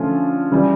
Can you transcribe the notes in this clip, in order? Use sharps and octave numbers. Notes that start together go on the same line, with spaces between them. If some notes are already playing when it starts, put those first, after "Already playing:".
Already playing: D3 F3 A3 C#4 F4
C#3 E3 G3